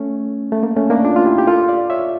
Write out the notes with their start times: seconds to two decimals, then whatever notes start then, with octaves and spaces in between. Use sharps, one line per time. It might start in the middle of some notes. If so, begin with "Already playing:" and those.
Already playing: A3 C#4
0.52 A3
0.63 A#3
0.77 A3 C#4
0.90 A#3 D4
1.04 D4 F4
1.16 F4
1.26 E4 G4
1.38 G4
1.47 F4 A4
1.68 D5 F5
1.90 C#5 E5